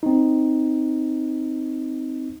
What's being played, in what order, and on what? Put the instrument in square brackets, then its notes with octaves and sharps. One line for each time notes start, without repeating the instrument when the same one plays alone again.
[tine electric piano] C4 D#4